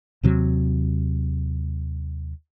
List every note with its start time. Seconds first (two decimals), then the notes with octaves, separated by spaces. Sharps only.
0.23 D#2 C3 F#3